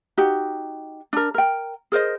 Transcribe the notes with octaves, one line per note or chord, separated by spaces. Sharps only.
D#4 F#4 G4
D4 A#4
A#4 G5
G#4 A#4 C5 D#5